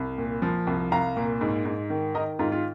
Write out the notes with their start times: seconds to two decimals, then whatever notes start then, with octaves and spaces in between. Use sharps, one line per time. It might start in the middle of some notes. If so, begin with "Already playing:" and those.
Already playing: C2
0.18 A#2
0.42 F3
0.67 C2
0.92 C2 F5 A#5
1.17 A#2
1.41 G#2
1.65 G#2
1.90 D#3
2.15 D#3 A#4 D#5
2.39 G#2 F4 A#4
2.52 F4